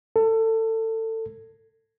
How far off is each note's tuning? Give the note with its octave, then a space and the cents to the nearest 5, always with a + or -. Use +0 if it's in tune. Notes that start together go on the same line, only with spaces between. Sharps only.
A4 +25